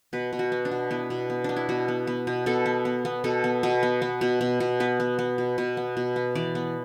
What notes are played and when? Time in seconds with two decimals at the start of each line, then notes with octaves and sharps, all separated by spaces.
0.13 B2 B4
0.33 B2
0.39 F#4
0.52 B3
0.65 D4
0.71 B2
0.91 B3 E4
1.10 B2
1.30 B3
1.44 B3 D4
1.56 E4
1.69 B2 F#4
1.88 B3
2.07 B3
2.27 B2
2.46 B2 A4
2.66 B3
2.85 B3
3.05 B3
3.24 B2 A4
3.44 B3
3.63 B2
3.83 B3
4.02 B3
4.21 B2
4.41 B2
4.60 B2
4.80 B3 B4
5.00 B3
5.19 B3
5.38 B2
5.58 B2
5.77 B3
5.97 B2
6.16 B3
6.35 E3 D5
6.55 B3